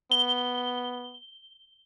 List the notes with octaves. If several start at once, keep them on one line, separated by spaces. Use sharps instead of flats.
B3 G7